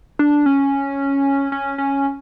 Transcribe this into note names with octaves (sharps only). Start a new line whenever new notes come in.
D4
C#4
C#4
C#4